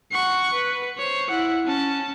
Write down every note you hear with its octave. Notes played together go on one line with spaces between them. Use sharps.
F#5 C#6
B4
C5 C#5
E4 F#5
C#4 A5